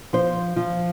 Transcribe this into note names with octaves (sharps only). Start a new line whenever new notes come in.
F3 C5
F3